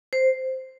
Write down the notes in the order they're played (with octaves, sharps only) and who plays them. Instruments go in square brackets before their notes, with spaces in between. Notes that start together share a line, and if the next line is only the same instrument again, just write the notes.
[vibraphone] C5